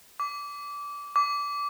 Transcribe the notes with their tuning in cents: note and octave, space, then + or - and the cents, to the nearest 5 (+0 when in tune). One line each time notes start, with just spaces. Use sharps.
D6 -20
D6 -20